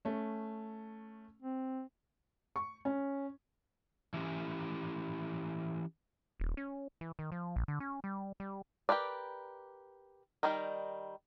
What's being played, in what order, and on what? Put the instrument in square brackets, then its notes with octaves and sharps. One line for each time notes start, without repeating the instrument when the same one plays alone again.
[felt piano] A3 C#4
[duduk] C4
[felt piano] C#6
C#4
[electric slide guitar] E3 C#4 G4
[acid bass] D#1
C#4
E3
D#3
F3
A#1
D3
C#4
G3
G3
[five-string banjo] G4 A#4 B4 D5
D#3 G3 D#4 A#4